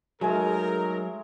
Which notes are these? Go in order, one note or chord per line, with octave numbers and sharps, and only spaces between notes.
F#3 G#3 A3 D#4 G#4 A#4 G#5